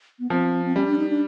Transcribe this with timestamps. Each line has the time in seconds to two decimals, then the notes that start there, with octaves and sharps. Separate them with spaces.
0.19 B3
0.30 F3 C4
0.65 C4
0.76 G3 C#4
0.87 D4
0.98 D#4
1.09 D4